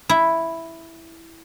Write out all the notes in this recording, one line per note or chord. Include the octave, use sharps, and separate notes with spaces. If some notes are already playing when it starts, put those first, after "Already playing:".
E4